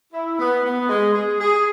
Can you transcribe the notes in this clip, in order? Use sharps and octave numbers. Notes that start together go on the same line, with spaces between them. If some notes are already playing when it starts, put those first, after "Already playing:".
E4
B3
B3
G#3
G#4
G#4